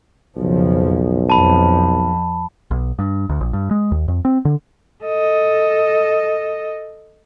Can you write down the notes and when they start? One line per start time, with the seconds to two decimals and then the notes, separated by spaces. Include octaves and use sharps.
0.36 B1 F2 C#3 F3
1.30 F2 F3 A5 B5
2.71 B1
2.99 G2
3.29 D2
3.41 A#1
3.53 G2
3.71 G#3
3.92 D#2
4.08 F2
4.25 C4
4.45 D3
5.04 A4 D#5